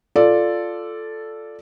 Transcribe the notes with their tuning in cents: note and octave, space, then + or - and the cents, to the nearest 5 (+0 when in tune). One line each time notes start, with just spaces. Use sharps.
F4 +0 A4 +0 D5 +0